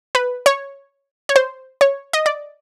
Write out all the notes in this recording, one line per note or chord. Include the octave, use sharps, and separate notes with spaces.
B4
C#5
C#5
C5
C#5
D#5
D5